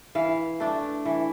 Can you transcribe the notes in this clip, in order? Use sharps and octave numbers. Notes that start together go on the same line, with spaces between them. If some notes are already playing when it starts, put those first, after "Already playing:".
E3 F5
A3 D4
E3